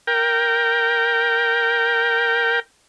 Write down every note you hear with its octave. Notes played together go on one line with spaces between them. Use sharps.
A#4 G5